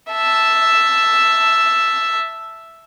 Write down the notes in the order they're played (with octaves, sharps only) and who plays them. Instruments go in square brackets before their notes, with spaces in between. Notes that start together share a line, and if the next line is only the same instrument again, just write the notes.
[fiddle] E5 A5